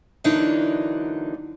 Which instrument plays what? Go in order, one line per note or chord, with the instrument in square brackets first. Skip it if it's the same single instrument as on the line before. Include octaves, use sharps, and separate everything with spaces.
[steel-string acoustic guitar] D3 E3 F#3 A#3 D4 D#4